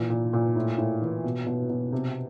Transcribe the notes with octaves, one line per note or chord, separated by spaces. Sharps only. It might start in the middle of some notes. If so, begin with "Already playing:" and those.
Already playing: A#2 E3
A#2
A#2
A2
A2
E3
B2
B2
B2
C3